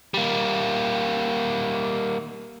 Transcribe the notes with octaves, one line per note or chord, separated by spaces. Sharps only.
G3 A#3